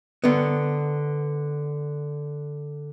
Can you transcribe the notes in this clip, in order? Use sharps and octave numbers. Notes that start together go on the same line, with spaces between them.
D3 B3